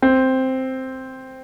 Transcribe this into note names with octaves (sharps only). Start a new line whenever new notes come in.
C4